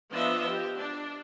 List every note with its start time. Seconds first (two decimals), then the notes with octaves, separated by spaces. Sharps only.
0.14 F3 B3 D4 D#5 E5
0.49 G4
0.78 D4